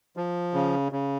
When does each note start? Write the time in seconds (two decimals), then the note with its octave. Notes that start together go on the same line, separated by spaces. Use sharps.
0.17 F3
0.54 C#3
0.92 C#3